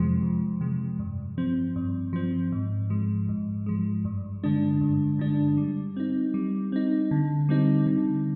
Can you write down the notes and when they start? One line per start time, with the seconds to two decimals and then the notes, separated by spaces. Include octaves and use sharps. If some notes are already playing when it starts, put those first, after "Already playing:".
Already playing: F2 C3 F3 G#3
0.22 F2
0.61 C3 F3 G#3
0.99 G2
1.38 F3 C4
1.76 G2
2.13 F3 C4
2.52 G#2
2.90 F3 G#3
3.29 G#2
3.66 F3 G#3
4.05 G2
4.44 D3 G#3 D4
4.81 G2
5.19 D3 G#3 D4
5.57 G3
5.96 C4 D#4
6.34 G3
6.72 C4 D#4
7.11 D3
7.49 G3 C4 D#4
7.87 D3